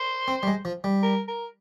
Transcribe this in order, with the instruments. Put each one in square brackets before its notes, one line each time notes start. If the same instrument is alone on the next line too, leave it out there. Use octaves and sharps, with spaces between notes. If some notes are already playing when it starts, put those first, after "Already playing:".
Already playing: [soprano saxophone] C5
[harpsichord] C4
G3
G#3
F3
G3
[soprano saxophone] A#4
A#4